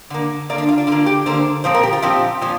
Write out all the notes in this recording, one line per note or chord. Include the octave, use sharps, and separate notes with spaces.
D3 A#3
D3 A#3 D5
D4
F4
D4
D3 A#3 F4
G4
D3 A#3 C5
A#2 F3 C4 C5
A#4
G4
F4
A#2 F3 C4 G4
A#2 F3